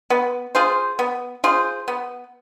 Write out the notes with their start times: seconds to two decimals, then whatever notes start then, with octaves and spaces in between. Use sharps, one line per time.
0.10 B3
0.55 F4 G#4 C5
0.99 B3
1.44 F4 G#4 C5
1.88 B3